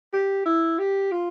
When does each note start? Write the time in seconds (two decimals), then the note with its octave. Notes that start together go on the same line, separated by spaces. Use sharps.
0.13 G4
0.45 E4
0.79 G4
1.12 F4